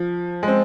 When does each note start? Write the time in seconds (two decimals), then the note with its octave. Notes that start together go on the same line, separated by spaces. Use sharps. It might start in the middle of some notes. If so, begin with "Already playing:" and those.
Already playing: F3
0.43 G#3
0.48 C4